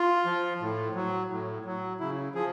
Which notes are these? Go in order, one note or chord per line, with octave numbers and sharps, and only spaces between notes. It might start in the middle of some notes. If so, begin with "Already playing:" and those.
Already playing: F4
F3
A2
F#3
A2
F#3
C#3 E4
F3 G#4